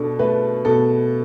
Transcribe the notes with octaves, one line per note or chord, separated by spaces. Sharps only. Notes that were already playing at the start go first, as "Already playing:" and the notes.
Already playing: B2 D4 A4
A3 B4
B2 A4